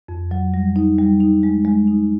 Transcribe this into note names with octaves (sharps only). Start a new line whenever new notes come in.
F2
F#3
G3
D#4
G3
D#4
G#3
G#3
D#4